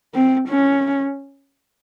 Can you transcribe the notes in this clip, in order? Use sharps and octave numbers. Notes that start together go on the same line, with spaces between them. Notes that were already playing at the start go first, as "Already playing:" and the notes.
C4
C#4